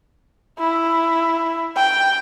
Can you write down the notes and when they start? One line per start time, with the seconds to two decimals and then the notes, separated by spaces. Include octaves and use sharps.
0.59 E4
1.76 G5